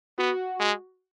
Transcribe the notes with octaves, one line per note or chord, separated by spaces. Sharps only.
B3 F#4
G#3